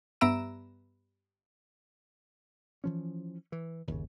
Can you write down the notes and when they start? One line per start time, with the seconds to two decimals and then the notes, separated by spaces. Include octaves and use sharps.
0.21 G2 B3 E5 A#5 E6 D7
2.84 E3 F3 C#4
3.52 E3
3.88 G1 D#2 C#3